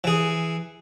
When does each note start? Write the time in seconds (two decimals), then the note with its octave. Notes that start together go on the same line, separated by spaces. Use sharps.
0.04 E3 G#4